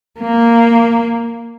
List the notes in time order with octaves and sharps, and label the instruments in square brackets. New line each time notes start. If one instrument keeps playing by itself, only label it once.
[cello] A#3